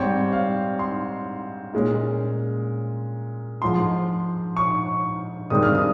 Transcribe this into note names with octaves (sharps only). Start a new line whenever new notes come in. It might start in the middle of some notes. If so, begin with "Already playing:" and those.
Already playing: G#2 G3 C4 C#5
F5
C6
A#2 G#3 C#4
G#2 F3 G#3 C6
C#6
G2 D#3 G#3 C4 D#6
F6
D#6